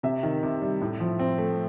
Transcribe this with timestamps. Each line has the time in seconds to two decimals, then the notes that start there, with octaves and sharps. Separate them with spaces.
0.03 C3 E5
0.23 D#3
0.43 C3
0.62 G3
0.82 A2
1.00 F3
1.19 C4
1.38 A3